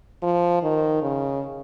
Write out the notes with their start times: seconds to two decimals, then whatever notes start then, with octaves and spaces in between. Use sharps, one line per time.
0.23 F3
0.63 D#3
1.02 C#3